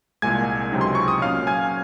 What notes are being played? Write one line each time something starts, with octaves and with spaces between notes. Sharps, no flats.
C2 A#2 G#3 G#5 G#6
C#2 C3 F#3 C4 D#4
C6
C#6
D#6
A#2 F#3 C#4 F5 F6
G#5 G#6